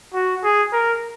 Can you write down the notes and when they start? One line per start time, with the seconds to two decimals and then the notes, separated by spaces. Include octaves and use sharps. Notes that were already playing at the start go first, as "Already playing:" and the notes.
0.14 F#4
0.44 G#4
0.73 A#4